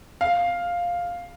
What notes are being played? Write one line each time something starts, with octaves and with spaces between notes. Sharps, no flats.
F5